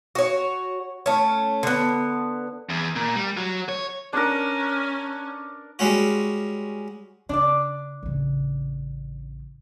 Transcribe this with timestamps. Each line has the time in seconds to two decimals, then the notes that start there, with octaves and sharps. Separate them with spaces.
0.15 F#4 C#5
1.06 A3 C#4
1.63 D3 B3
2.69 E2
2.96 A#2
3.16 G3
3.37 F#3
3.69 C#5
4.13 C#4 D4 A#4
5.79 G3 G#3 C#4 F#4
7.29 C#3 D4 D5
8.03 A1 C#3